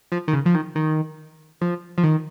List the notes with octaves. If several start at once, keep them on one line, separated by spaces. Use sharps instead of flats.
F3
D#3
C#3
F3
D#3
D#3
F3
F3
D#3